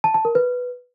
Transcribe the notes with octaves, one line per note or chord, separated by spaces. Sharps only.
A5
A5
A#4
B4